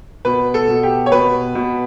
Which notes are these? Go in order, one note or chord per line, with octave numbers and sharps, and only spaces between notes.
B2 B4
A4
B2
G4
C#5
B2 B4
B2